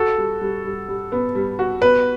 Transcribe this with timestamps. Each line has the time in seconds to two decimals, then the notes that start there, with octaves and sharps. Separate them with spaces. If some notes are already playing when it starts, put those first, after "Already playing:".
Already playing: F#4 A4
0.18 G3
0.41 G3
0.64 G3
0.88 G3
1.12 B3
1.35 G3
1.59 F#4
1.81 B3 B4